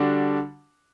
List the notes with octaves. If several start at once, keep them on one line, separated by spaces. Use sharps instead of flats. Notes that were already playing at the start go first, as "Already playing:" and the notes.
Already playing: D3 G3 D4 F#4